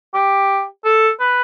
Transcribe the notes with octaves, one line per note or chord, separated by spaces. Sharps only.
G4
A4
B4